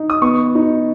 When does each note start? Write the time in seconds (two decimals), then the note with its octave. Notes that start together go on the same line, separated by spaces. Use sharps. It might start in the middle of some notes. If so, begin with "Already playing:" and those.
Already playing: D#4
0.10 D#6
0.22 B3 C#6
0.55 D#4